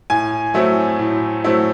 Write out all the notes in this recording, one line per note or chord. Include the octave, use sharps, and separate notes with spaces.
A2 G#5
F#3 A3 C4 E4
A2
F#3 A3 C4 E4